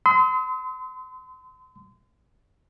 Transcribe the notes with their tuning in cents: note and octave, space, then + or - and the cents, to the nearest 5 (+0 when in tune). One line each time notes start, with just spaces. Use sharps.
C6 -35 D#6 +45